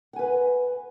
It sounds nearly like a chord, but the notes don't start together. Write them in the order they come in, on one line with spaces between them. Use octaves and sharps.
F#5 G#5 B4